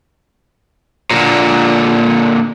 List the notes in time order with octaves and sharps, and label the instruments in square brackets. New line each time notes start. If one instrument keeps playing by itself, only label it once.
[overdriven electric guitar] A#2 D3